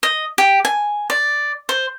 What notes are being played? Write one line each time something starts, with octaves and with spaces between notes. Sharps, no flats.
D#5
G4
G#5
D5
C5